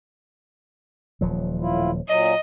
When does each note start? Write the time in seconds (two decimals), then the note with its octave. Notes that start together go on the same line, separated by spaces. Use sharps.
1.21 D#1 F3 F#3
1.61 A2 E4 F4
2.08 A#2 F#3 D#5